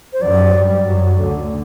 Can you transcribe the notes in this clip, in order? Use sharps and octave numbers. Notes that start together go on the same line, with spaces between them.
C5
F#2 F#3 D5
G2 G3
F#2 F#3
D2 D3